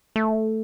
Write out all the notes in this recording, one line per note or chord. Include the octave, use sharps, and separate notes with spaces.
A3